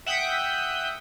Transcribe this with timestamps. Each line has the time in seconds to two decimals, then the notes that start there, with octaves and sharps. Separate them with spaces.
0.06 E5 F#5 G5 D#6 G6 B6